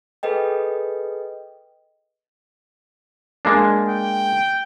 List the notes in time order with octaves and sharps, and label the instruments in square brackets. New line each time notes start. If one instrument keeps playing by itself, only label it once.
[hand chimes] G#4 A4 B4 D#5 G5
[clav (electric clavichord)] G#3 A#3 D4
[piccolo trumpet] G5